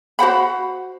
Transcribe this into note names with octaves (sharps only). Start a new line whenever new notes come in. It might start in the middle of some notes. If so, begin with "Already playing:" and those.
F#4 C5 F#5 B5